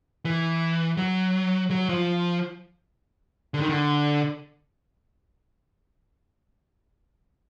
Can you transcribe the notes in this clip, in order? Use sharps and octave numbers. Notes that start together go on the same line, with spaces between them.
E3
F#3
F#3
F3
D3
D#3
D3